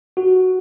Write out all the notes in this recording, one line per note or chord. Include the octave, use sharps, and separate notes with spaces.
F#4